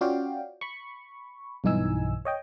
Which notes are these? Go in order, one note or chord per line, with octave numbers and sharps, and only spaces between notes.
C#4 F4 F#4 D5 F5 G5
B5 C#6
B1 G2 E3 D#4 G#5 E6
C#5 D#5 G5